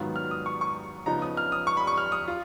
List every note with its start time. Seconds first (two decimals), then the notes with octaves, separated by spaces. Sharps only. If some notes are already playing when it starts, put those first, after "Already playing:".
Already playing: G#2 D#3 F#3 B3 F4
0.16 F6
0.31 D#6
0.46 C#6
0.61 C#6
1.06 C#3 F3 B3 D#4 A#5
1.22 D#6
1.37 F6
1.52 D#6
1.67 C#6
1.77 B5
1.87 C#6
1.98 F6
2.12 D#6
2.28 F4